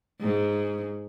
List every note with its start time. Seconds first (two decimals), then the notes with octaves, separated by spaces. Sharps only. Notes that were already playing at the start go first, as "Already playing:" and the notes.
0.21 G#2